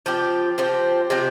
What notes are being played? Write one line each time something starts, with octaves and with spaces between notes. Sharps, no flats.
F3 C4 G4
F3 C4 G4
C3 F3 C4 G4